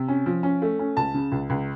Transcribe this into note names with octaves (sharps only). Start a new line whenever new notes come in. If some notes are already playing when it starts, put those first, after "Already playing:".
Already playing: C3
C#4
F3
C#4
A3
C#4
C#2 A5
C#3
C#2
C#2